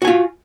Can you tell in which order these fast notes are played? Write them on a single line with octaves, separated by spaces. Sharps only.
F#4 G#5 F4